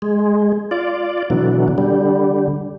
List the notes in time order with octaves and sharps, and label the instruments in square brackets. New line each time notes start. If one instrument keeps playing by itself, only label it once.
[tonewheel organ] G#3
F4 D5
B2 D3 E3 F#3
D3 G3